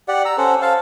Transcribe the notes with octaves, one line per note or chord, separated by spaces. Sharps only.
G4 D5 F#5
A#5 E6
C#4 A4 C5 F#5
C5 F5 A5